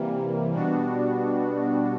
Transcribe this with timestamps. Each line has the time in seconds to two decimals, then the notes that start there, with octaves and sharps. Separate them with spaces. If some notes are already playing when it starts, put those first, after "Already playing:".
Already playing: C3 E3 G3 A#3
0.53 B2 G3 B3 D4 F#4